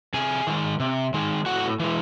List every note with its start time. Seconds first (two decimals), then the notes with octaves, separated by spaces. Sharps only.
0.14 C3 G#4 G#5
0.47 D#3 G#3
0.80 C3
1.14 D#3 G#3
1.46 A2 F#4 F#5
1.80 E3 G#3